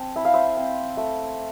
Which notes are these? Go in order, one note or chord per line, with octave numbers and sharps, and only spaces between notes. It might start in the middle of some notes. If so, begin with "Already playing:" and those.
Already playing: C4 G5 A5
E4 E5
F5
C5 E5
C4
A3